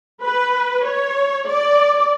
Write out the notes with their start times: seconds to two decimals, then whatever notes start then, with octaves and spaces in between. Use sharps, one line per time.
0.22 B4
0.85 C#5
1.47 D5